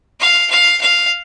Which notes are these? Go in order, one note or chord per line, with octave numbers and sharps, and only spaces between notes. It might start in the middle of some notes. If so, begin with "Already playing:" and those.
F5
F5
F5